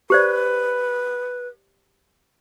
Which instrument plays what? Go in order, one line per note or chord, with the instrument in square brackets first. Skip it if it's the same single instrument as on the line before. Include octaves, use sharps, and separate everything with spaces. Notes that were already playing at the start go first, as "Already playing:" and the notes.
[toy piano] G4 C5 D5 [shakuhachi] B4